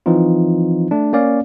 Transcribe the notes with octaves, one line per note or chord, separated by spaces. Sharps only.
E3 F3 C4 D#4 F4
A3 D4
A#3 C#4 D5 F5